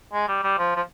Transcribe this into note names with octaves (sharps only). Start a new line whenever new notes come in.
G#3
G3
G3
F3
F3